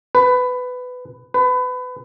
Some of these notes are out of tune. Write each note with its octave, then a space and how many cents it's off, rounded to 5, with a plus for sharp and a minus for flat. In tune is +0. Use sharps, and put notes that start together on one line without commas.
B4 +15
B4 +25